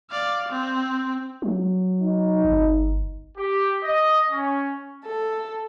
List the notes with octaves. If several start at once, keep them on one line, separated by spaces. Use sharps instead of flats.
D5 F5
C4
F#3
D#4
G1
G4
D#5
C#4
A4